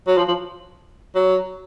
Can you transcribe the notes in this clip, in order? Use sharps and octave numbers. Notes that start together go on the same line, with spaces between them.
F#3
F3
F3
F#3